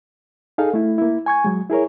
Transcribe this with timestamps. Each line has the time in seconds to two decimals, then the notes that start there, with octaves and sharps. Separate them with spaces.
0.58 D#4 G#4 A4 F5
0.74 A3 E4
0.98 A#3 E4
1.26 G#5 C#6 G#6
1.44 F#3 G#3
1.70 E4 G#4 A#4 C#5